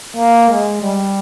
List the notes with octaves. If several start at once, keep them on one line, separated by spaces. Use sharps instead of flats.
A#3
G#3
G3